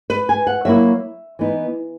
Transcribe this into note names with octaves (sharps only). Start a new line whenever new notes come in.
B4
G#5
F#5
F#3 A#3 E4 E5
E3 B3 D#4